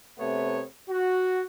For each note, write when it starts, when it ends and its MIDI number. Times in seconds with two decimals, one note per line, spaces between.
0.19 0.63 48
0.19 0.63 57
0.19 0.63 59
0.19 0.63 73
0.89 1.42 66